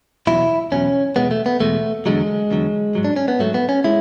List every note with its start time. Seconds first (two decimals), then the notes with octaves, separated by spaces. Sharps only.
0.27 E2 B2 F#3 E4
0.72 E2 B2 F#3 C#4
1.16 E2 B2 G#3 B3
1.31 A3
1.46 B3
1.60 E2 B2 G#3 A3
2.06 E2 D3 F#3 G#3
2.51 E2 D3 F#3
2.95 G#2 F#3
3.04 D4
3.16 C#4
3.28 B3
3.39 G#2 F#3 A3
3.54 B3
3.69 C#4
3.84 G#3 E4